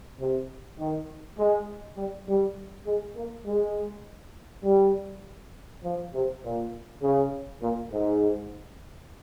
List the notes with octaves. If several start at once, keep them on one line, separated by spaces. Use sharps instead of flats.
C3
D#3
G#3
G3
G3
G#3
A#3
G#3
G3
F3
C3
A#2
C#3
A#2
G#2